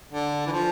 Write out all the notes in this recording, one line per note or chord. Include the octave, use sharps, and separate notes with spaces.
D3
E3
F3